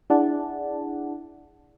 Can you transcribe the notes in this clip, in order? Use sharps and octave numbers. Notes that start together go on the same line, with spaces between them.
D4 E4 G#4 D5 F#5 A5